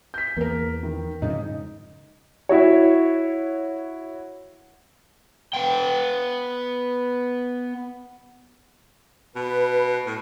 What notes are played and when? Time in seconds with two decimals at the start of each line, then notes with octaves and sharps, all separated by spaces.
0.14 G6 B6
0.37 E2 A#3 A#4
0.83 D#3
1.22 F2 G#2 C#3 D#4
2.49 E4 F#4 C#5
5.54 B3 G5
9.36 B2 B4
10.07 A2